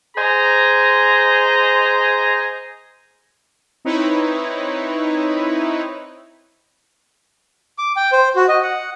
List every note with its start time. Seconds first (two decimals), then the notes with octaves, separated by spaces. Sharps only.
0.16 G#4 C5 D#5 G#5 A#5
3.85 C4 D#4 E4 B4 C#5
7.78 D6
7.96 G5
8.12 C5
8.36 F#4
8.48 D#5
8.63 F#5